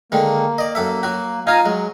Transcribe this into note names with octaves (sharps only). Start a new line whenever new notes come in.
D3 D#3 G#3 A#3
D5 D#5
F#2 A4 E5
F#3 F#4
D#4 F4 F5 G#5 A#5
F#3 G#3